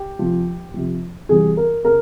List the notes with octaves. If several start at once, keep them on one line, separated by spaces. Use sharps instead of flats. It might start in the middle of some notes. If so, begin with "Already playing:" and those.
Already playing: G4
C3 F3
C3 F3
C3 E3 G3 G#4
A#4
C#3 A#4